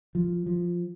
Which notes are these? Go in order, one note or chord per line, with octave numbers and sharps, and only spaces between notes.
F3
F3